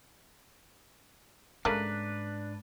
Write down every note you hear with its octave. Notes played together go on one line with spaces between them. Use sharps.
G#2 C#3 A3 A#3 D4 B4